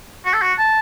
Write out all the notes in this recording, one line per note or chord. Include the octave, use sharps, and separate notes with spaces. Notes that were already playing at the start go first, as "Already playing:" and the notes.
F#4
A4
F#4
A5